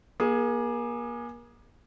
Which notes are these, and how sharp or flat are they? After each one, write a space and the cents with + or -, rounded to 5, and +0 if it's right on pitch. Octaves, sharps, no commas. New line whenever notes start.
A#3 +35 G#4 +0